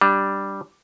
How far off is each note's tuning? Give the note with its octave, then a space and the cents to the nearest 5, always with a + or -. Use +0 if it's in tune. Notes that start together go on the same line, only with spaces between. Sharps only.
G3 +0 D4 +0